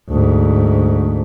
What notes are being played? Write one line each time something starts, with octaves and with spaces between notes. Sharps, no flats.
D2 G#2